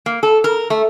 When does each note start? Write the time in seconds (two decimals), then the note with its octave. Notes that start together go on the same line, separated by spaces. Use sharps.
0.06 A#3
0.23 A4
0.44 A#4
0.70 A3